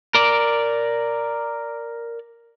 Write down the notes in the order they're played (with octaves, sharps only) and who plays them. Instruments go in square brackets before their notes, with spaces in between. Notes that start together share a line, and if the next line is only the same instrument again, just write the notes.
[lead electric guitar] A#4 D5